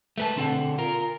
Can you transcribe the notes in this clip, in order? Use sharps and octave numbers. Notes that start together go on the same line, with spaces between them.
A3 B4 A5
B2 D3 C4 A4 F#5
F4 A#4